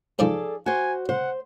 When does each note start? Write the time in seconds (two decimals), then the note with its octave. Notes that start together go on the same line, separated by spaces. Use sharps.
0.19 G#2 F3 C#4 G#4 A4 D5
0.66 F#4 C5 G#5
1.09 C5 F#5